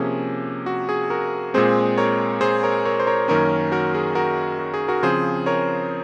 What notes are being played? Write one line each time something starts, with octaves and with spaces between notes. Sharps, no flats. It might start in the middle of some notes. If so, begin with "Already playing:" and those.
Already playing: C3 F3 A#3 C#4 G#4
F#4
G#4
F#4 A#4
A#2 G#3 C4 G#4 C5
A#4 C#5
G#4 C5
A#4 C#5
A#4 C#5
C5
A#4 C#5
F#2 D#3 A#3 C#4 A#4 C#5
F#4 A#4
G#4
F#4 A#4
F#4
G#4
F#4 A#4
C#3 F3 C4 G#4 C5
A#4 C#5